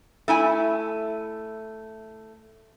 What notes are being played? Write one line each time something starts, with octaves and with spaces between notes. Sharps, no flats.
A3 E4 G#5